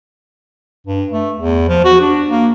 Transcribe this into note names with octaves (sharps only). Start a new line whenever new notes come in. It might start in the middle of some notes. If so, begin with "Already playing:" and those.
G2
A3
E2
F3
F#4
D4
A#3